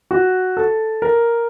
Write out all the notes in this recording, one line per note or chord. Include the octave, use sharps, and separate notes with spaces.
F#4
A4
A#4